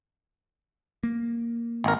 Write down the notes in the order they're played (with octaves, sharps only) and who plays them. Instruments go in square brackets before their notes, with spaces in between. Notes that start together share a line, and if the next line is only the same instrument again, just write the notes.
[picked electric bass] A#3
[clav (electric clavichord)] G#1 A#4